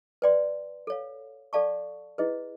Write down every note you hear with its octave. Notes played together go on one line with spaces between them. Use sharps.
B4 D5 G5 C6
A4 C#5 F5
A4 D5 F5 A5 C#6
E4 G#4 B4 D#5